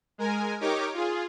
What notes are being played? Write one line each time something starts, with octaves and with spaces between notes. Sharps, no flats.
G#3 A#4 G#5
D#4 G4 A#4 C#5 D6
F4 G#4